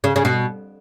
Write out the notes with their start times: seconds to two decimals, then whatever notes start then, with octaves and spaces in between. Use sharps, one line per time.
0.04 C#3
0.16 C#3
0.25 B2